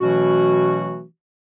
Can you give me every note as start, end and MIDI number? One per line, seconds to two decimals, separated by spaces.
0.01 1.04 47
0.01 1.04 52
0.01 1.04 54
0.01 1.04 57
0.01 1.04 61
0.01 1.04 66